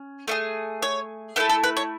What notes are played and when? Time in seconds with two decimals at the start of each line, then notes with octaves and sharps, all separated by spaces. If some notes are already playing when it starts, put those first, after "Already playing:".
Already playing: C#4
0.28 A3 E4 G#4
0.82 C#5
1.36 A3 E4 A4 B4
1.49 A4
1.63 B4
1.77 C#5